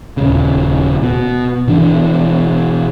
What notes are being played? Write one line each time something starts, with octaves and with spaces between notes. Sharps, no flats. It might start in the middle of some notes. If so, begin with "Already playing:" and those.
D#1 C#3
B2
B2 E3 D4